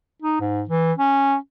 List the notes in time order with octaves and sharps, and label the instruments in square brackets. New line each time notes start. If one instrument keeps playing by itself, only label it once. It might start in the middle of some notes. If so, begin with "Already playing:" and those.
[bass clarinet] D#4
G#2
E3
C#4